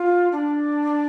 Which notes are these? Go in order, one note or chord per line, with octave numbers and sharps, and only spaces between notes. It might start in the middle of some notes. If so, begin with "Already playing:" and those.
Already playing: F4
D4